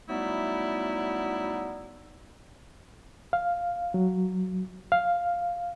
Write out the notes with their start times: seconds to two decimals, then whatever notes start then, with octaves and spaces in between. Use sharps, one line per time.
0.09 F#3 G3 A3 B3 D#4 E4
3.33 F5
3.94 F#3
4.92 F5